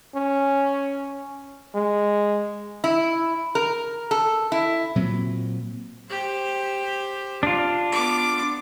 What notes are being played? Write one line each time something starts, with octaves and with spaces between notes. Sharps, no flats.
C#4
G#3
E4
A#4
A4
E4
A#2 F#3 C4
G4 C5
D4 F4
B3 D6